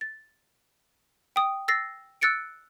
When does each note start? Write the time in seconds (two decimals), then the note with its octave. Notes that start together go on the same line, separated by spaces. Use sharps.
0.01 A6
1.36 G5 D#6
1.68 E6 A6 A#6 C7
2.21 E6 F#6 A6 C#7 D7